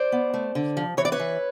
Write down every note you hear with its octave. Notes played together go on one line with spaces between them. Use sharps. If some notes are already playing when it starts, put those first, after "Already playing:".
Already playing: C5 D5
B3
A3
D3
F3
E3 C#5
D5
B4 C#5
E3